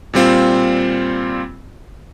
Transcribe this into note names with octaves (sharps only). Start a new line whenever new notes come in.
A#2 G3 C4 F4